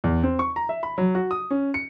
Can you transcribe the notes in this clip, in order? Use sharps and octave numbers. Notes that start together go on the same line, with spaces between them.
E2
C4
C#6
A#5
E5
B5
F#3
F#4
D#6
C#4
C#7